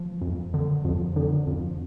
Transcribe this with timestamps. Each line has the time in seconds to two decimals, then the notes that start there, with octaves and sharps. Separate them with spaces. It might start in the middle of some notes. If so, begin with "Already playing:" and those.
Already playing: F3
0.22 F2
0.54 D3
0.85 F2
1.16 D3
1.47 F2